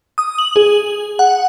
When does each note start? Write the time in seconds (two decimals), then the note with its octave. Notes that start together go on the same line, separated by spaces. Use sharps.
0.18 D#6
0.38 F#7
0.56 G#4
1.19 F#5